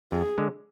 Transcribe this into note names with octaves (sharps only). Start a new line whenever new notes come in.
F2 G#4
D3 G#3